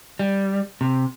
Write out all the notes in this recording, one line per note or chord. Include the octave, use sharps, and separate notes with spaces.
G3
C3